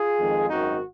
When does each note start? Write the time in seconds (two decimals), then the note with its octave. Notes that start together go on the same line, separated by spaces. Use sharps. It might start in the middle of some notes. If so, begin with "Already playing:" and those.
Already playing: F4 G#4
0.19 F2 D#3 G#3
0.50 G#1 F#2 D#3 D#4 F#4